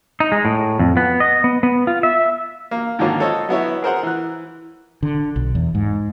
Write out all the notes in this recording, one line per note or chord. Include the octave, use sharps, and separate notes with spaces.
D#4
G#3
A2
F2
B3
D#5
B3
B3
F4
E5
A#3
G#2 D3 D#3 F3 A#3 C#4
A4 C5 C#5 D#5
F#3 B3 E4 C#5
G#4 A#4 C5 F#5
E3 F#6
D3
B1
E2
G#2